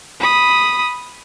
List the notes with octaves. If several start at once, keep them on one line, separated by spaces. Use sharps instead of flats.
B5 D#6